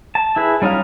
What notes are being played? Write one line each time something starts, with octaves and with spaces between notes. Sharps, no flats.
A5
E4 G#4 B4
G3 C#4 D#4 F4 F5